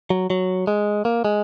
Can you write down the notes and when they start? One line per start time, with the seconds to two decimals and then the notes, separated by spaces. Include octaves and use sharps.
0.10 F#3
0.30 F#3
0.67 G#3
1.05 A#3
1.25 G#3